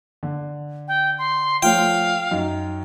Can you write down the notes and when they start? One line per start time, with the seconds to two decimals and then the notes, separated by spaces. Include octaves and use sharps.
0.23 D3
0.88 G5
1.19 C6
1.62 F3 A3 C#5 F5 G5
2.31 F#2 D#4